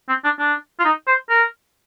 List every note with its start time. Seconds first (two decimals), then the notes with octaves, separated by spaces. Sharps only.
0.09 C4
0.24 D4
0.39 D4
0.79 F4
0.84 D#4
1.07 C5
1.29 A#4